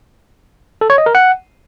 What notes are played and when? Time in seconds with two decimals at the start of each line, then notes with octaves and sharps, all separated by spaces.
0.81 A4
0.90 C#5
0.98 D#5
1.06 A#4
1.15 F#5